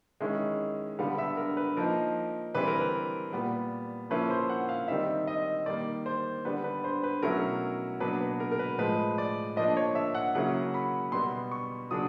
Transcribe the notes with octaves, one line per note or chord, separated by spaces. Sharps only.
D#3 G#3 C#4 E4
D3 G3 B3 F5
E5
A#4
B4
F3 A#3 D#4 A#4
E3 G3 C4 B4
A#4
B4
A#2 G3 B3
F3 A#3 C#4 E4 B4
C5
F#5
F5
D#3 G3 C4 D#4 E5
D#5
D#3 G3 A#3 D5
C5
D3 G3 B3 B4
B4
C5
B4
B2 F#3 A3 C#4 E4 A#4
B2 F#3 A#3 D4 B4
B4
A#4
A#4
B4
A2 F3 G#3 B4
D5
F3 A#3 D4 D#5
C#5
E5
F#5
C#3 F#3 A#3 C#4 E4 F#5
B5
B2 G3 B3 C6
C#6
C#3 F#3 A#3 D4 D#6